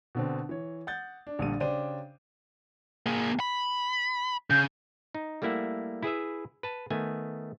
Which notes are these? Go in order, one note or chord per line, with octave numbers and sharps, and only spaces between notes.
B2 D3 C4
E3 C#5
F#5 G6 A6
D4
A#1 D3 G3 D#7
C#3 D4 G4 C5 D5 D#7
A#3 G#4
B5
C#3 G6
D#4
G3 A3 A#3 E4 E5 F#5
E4 G#4 B4 E5
B4 A5
D#3 A3 B3 G#5